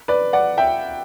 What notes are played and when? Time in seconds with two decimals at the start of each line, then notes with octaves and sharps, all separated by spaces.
0.08 B4 D5
0.33 D5 F#5
0.58 E5 G5